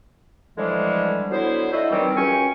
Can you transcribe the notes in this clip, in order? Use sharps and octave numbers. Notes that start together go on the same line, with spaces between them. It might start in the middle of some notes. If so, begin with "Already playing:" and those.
A2 D3 E3 F3 G3 G#3
D3 F#3 B3 E4 C5
D4 E4 F#4 A4 D#5 E5
B2 D#3 E3 F#3 G3 C4
C#2 F#2 C#4 G5 G#5 C#6